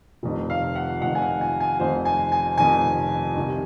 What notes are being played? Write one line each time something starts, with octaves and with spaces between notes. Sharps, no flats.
F1 F2 D#3
F5
F#5
F1 F2 D#3 F#5
G#5
F#5
G#5
G#5
F1 F2 D#3 C5
G#5
G#5
F1 F2 D#3 G#5
C2 C3 D#3